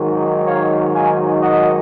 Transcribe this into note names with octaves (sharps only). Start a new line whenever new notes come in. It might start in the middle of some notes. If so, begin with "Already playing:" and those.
Already playing: G#2 D#3 F#3
C#5 F5
F5 G#5
D#5 F#5